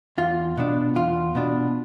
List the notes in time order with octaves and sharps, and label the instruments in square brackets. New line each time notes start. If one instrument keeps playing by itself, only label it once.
[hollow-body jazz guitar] E2 F4
B2 B3 D4
E2 F4
B2 B3 D4